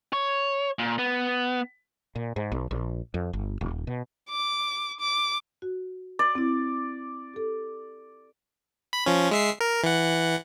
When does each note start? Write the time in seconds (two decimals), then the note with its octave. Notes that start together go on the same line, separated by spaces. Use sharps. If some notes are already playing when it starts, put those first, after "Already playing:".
0.13 C#5
0.79 A#2
0.99 B3
2.15 A#2
2.36 G#2
2.52 B1
2.71 A#1
3.14 F2
3.33 G1
3.61 D#1
3.87 B2
4.30 D6
5.00 D6
5.62 F#4
6.19 D5
6.35 C4 E4
7.34 G4 A4
8.93 B5
9.06 F3 C#4
9.31 G#3 E5 C7
9.60 A#4
9.84 E3 F#5